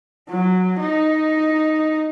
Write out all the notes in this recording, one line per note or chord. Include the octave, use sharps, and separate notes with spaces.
F#3
D#4